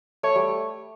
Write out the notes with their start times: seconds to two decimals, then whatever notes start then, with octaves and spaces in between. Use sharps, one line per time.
0.23 A3 C#5
0.36 G3